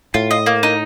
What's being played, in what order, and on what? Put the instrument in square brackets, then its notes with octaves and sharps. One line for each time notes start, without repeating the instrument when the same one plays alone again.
[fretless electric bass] A2 [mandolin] F4
[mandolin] D#5
A#3
D#4